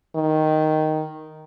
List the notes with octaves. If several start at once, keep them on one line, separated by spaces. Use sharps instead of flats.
D#3